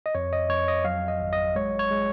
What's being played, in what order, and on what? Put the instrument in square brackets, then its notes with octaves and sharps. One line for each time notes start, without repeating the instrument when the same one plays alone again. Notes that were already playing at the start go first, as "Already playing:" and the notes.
[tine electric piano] D#5
F2 C#5
D#5
F2 C#5
D#5
F#3 F5
D#5
G#1
D#5
G#3 C#5
C#5
G#3